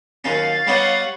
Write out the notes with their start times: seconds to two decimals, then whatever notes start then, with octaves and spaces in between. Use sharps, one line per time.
0.24 D#2 F#3 C#4 F5 A6
0.67 G3 B3 D#4 C#5 F#5